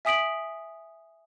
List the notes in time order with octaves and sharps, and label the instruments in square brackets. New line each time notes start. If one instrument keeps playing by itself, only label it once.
[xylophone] E5 G#5 D#6 B6 D7 F#7